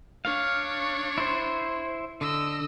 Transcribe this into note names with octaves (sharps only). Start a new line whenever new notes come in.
D4 C#5 F5
E4 C5
D3 D#5 E6